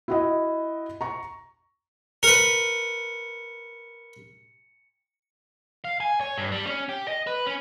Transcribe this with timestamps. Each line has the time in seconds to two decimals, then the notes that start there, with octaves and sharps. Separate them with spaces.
0.08 E4 F#4 D#5
1.01 A#5 C#6
2.23 A#4 B4 C#7
5.85 F5
6.00 G#5
6.21 C#5
6.37 G2
6.52 G3
6.67 C#4
6.89 G4
7.08 D#5
7.27 B4
7.47 C#4